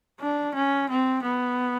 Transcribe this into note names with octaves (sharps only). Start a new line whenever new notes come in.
D4
C#4
C4
B3